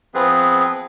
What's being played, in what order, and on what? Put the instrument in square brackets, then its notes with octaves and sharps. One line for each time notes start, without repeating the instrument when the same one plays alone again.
[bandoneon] F3 B3 C4 G#4 B4